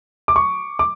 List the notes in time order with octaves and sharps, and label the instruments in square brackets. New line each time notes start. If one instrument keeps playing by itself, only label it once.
[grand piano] D6
C#6
D6